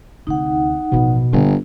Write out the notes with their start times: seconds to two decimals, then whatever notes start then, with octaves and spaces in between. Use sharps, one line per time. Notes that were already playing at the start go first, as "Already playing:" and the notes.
0.27 D2 C3 D#4 F#5
0.92 A1 B2 F3
1.33 G1 A#2 D3